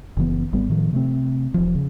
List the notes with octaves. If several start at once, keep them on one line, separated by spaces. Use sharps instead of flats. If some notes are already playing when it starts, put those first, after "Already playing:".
F#1 C#3 E3 B3
G#1 G3 B3
A2 D#3 F3
C3 A3 C4
E1 F3
C#3